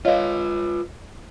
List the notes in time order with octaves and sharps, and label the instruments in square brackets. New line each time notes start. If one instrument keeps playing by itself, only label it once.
[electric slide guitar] F4 B4 [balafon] C#5 D#5 F5